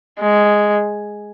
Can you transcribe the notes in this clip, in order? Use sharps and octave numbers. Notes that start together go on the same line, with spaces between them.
G#3